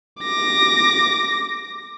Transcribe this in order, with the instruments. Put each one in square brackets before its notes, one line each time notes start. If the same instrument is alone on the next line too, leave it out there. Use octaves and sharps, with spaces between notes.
[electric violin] D6 A#6